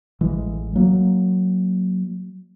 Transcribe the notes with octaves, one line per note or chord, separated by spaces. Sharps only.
A1 E3 G#3
F#3 A#3